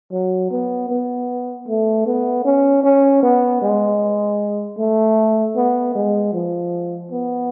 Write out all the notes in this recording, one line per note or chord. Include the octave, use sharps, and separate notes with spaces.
F#3
B3
B3
A3
B3
C#4
C#4
B3
G#3
A3
B3
G#3
F3
B3